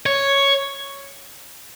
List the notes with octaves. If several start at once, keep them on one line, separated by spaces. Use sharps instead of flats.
C#5